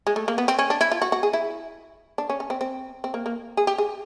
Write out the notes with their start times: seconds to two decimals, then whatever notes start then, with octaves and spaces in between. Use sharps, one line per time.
0.07 G#3
0.16 A3
0.28 A#3
0.38 B3
0.48 C4
0.59 C#4
0.70 D4
0.81 E4
0.92 F4
1.02 F#4
1.12 F#4
1.23 G#4
1.33 E4
2.18 D4
2.30 C#4
2.40 C#4
2.50 C4
2.61 C4
3.04 C4
3.14 A#3
3.26 A#3
3.57 G#4
3.67 G4
3.78 G#4